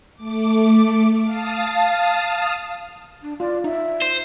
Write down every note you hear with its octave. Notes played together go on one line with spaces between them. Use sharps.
A3 D6
F5 A5 D#6
D4
F4 D5
D#4 E5
C5